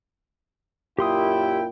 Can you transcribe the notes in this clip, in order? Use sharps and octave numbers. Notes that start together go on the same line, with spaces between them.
F#2 A#2 E4 G4 G5 C6 D#6